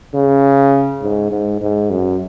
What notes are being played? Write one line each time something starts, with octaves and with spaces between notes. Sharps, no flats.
C#3
G#2
G#2
G#2
F#2